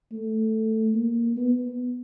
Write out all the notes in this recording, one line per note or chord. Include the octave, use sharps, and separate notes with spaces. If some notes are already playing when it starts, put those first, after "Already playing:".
A3
A#3
B3